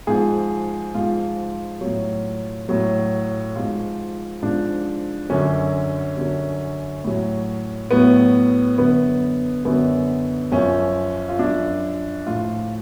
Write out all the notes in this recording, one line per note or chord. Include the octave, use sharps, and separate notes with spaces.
G#2 F3 G#4
G#2 F3 F4
A2 F#3
A2 F#3
G#2 F3 F4
G#2 F3 D4
F#2 D3 F#3 C#4
F#2 D3 F#3
A2 F#3
A2 F#3 B3
F#2 D3 F#3 B3
F#2 D3 F#3 B3
F#2 F3 C#4
F4
F#2 F3 D4
A2 F3 F4